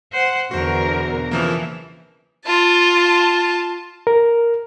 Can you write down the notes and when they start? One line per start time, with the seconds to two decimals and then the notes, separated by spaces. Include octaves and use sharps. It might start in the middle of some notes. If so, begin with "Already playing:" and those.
0.12 C5 F#5
0.51 E2 B2 D3 F#4 A#4 C5
1.31 C#3 E3 F3 A#3
2.45 F4 A5
4.07 A#4